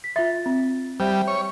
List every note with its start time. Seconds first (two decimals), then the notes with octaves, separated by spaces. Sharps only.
0.04 B6
0.16 F4 E5 A6
0.46 C4
1.00 G3 C5 E5
1.28 C#5